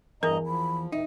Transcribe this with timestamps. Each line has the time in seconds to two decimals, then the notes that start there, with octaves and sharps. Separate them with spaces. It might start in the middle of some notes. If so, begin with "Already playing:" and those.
0.23 E2 G2 A#4 D#5 A#5
0.47 F3 B5
0.92 D2 A2 D#3 D#4 E5